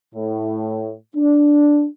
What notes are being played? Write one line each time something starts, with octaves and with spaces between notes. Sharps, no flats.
A2
D4